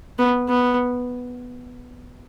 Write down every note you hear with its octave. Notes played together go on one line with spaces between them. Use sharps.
B3
B3